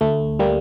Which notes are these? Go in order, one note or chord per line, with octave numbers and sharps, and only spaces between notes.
D2 A3
G3 A#3